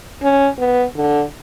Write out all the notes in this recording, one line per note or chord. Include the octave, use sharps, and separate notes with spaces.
C#4
B3
D3